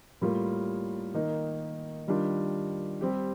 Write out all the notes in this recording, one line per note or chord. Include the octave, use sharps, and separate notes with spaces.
A2 G3 A#3 F4
D#3 A#3 D#4
D#3 G3 D4 F4
G3 C4 G4